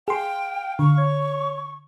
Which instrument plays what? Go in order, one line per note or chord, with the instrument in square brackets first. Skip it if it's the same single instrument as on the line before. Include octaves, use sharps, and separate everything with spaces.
[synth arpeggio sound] G#4 C6 [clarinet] F5 [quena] G5
[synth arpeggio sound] D3 [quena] C#6
[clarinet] C#5